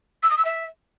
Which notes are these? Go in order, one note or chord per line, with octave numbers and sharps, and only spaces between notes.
E6
D#6
E6
E5